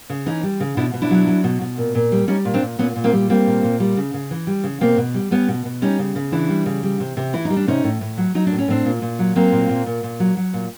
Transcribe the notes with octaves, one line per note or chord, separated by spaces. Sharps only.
C#3
E3 C#4 D#4
G3
C#3
B2 D4 E4
B2
D4 E4
F#3
F#3
B2
B2
A#2
A#2
G3
G3 C#4 D#4
A#2
C4 D4
A#2
A#2 B3 C#4
A#2
A#3 C4
G3
G3 A#3 C4
A#2
A#2
G3
C#3
C#3
E3
G3
C#3
B2 A#3 C4
B2
G3
G3 B3 C#4
B2
B2
G3 C#4 D#4
C#3
C#3
E3 D4 E4
G3
C#3
G3
C3
C3
E3 E4
D#4
G3
D4
C3 C#4 D#4
A2
A2
F#3
F#3 D#4
D4
A2
C#4
A2 C4 D4
A#2
A#2
F#3
F#3 A#3 C4
A#2
A#2
A#2
A#2
F#3
F#3
A#2